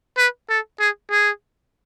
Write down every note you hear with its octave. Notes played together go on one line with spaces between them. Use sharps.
B4
A4
G#4
G#4